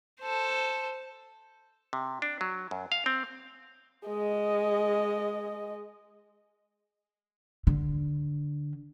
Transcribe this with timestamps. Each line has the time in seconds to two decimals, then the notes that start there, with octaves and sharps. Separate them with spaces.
0.21 A4 C5
1.93 C3
2.22 D4
2.41 F#3
2.71 F#2
2.92 F5
3.06 C4
4.07 G#3 D#5
7.67 D3